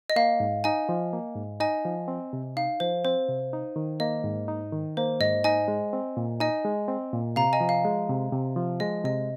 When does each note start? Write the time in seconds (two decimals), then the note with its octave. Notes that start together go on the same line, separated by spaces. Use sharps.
0.10 D#5
0.16 A#3 F5
0.40 G#2
0.64 D#4 D#5 G#5
0.89 F3
1.13 A#3
1.36 G#2
1.60 D#4 D#5 G#5
1.85 F3
2.08 C4
2.33 C3
2.57 D#4 F5
2.80 F3 C5
3.05 C4 C5
3.28 C3
3.53 D#4
3.76 D#3
4.00 A#3 D#5
4.24 G#2
4.48 D#4
4.72 D#3
4.97 A#3 C5
5.20 G#2 D#5
5.44 D#4 D#5 G#5
5.68 G#3
5.93 C4
6.17 A#2
6.40 D#4 D#5 G#5
6.65 G#3
6.88 C4
7.13 A#2
7.36 C3 F5 A#5
7.53 D#5 G#5
7.61 F3
7.69 F5
7.85 G#3
8.09 C3
8.32 C3
8.56 F3
8.80 G#3 D#5
9.04 C3 D#5